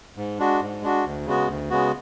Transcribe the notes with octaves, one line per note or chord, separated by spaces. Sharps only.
G#2
G#3 D4 F#4
G#2
G#3 D4 F#4
D2
C#3 G#3 B3 F#4
D2
C#3 G#3 B3 F#4